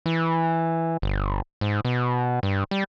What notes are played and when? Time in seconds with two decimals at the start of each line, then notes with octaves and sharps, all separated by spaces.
0.06 E3
1.02 G1
1.61 G#2
1.85 B2
2.43 G2
2.71 G3